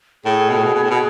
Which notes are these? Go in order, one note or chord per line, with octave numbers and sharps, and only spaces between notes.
A2 G#4
B2
A2
B2
B2
A2
B2